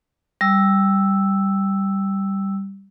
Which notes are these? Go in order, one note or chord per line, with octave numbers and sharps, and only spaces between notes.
G3 E6